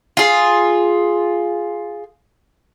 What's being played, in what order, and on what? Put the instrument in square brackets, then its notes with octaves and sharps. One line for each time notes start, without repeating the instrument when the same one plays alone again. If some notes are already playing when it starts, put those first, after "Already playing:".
[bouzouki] F4 G#4